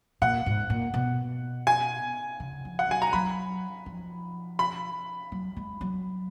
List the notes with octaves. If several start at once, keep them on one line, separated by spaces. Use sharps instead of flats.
A#2 F#5
G#2
A#2
B2
G#5
C#3
F3
F#5
F#3 G#5
A#5
F#3 B5
F3
B5
F#3
G#3
F#3